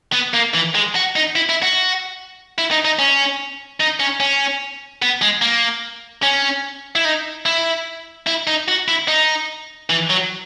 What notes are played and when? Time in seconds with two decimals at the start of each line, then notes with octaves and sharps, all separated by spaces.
0.13 B3
0.34 A#3
0.54 E3
0.75 G#3
0.95 F#4
1.16 D#4
1.36 E4
1.50 E4
1.63 F#4
2.58 E4
2.71 D#4
2.85 D#4
2.99 C#4
3.80 D#4
4.00 C#4
4.20 C#4
5.02 B3
5.22 G#3
5.42 A#3
6.23 C#4
6.95 E4
7.05 D#4
7.45 E4
8.27 E4
8.47 D#4
8.68 F#4
8.88 E4
9.08 D#4
9.90 E3
10.10 F#3